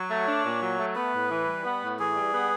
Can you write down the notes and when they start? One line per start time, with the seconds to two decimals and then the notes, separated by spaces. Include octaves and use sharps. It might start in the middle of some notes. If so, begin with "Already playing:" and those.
Already playing: F#3 C#5
0.10 A3
0.27 D4
0.44 A#2
0.62 F#3
0.79 A3
0.95 B3 B4
1.13 A2
1.30 E3
1.47 G3
1.64 B3
1.81 A2
1.99 E3 G#4
2.16 G3
2.33 B3